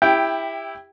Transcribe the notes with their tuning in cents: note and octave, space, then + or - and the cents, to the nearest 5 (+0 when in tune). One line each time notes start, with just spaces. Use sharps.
E4 +0 G4 +20 G5 +0